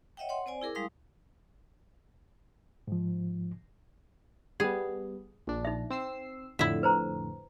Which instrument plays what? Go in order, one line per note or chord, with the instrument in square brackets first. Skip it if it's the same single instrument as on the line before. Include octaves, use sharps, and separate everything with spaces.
[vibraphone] C#5 D#5 E5 F#5 G5
C#5 F#5 C6
C4 C5 D5 G#5
E4 G#4 A#4 D6
G3 G#3 E4 F5 C6 D#6
[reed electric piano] G#2 F3
[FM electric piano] G3 B3 [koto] G#4
[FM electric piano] A#1 D4
[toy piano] D#4 E5
[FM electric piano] C4 E6 C7
[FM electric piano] F2 A2 D3 [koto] E4 E5
[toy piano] B4 C5 A#5